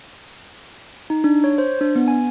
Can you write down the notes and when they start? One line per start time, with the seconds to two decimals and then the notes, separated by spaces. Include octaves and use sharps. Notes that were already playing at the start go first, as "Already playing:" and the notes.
1.10 D#4
1.24 D4
1.44 C#5
1.58 C5
1.81 D4
1.96 B3
2.08 G#5